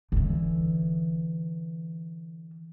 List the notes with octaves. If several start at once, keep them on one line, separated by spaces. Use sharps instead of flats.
D3 E3